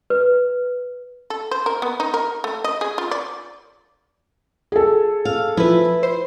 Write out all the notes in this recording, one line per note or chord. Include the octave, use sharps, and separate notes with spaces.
B4
A4
C5
A#4
B3
D#4
A#4
A3
D#5
G#4
F4
D5
G#4 A4
F5
F3 E4 B4
C5 C6